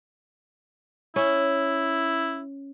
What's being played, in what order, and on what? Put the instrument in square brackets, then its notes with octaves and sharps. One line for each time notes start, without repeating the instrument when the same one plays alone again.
[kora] C#4 [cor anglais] E4